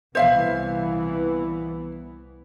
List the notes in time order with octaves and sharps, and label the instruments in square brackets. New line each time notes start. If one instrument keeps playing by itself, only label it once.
[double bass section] C2 E3 B3 [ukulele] C5 E5 F5